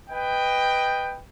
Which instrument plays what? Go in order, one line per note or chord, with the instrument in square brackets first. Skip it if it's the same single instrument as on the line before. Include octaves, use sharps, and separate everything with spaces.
[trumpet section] B4 D#5 G5